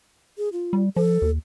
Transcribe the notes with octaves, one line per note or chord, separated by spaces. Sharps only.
G#4
F4
G3
F3 A4
D#2